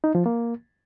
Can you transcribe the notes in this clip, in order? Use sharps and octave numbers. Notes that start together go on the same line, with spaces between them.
D#4
F3
A#3